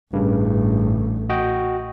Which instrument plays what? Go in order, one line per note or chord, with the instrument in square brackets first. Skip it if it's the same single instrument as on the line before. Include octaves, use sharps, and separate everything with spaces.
[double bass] A1 [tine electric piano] G2 C#3
[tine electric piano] F#4 D#5 G5